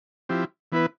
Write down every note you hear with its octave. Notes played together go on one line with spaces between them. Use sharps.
F3 C4 E4 G4
E3 B3 E4 B4